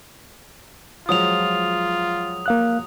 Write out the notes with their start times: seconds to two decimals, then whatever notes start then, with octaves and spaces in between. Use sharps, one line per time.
1.09 F3 F#3 G#3 F4 D#6 F7
2.46 A#3 F5 F#6